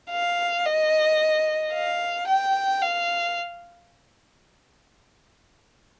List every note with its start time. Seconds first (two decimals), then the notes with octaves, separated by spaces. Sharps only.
0.11 F5
0.66 D#5
1.73 F5
2.28 G5
2.82 F5